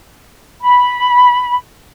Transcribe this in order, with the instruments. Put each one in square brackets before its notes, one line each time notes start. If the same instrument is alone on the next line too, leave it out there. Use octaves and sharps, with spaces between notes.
[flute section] B5